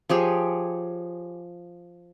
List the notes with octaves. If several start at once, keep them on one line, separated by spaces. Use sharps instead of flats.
F3 G4 G#4 C#5